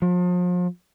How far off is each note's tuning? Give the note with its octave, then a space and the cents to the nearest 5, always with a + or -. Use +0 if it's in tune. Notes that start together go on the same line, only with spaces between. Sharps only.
F3 +40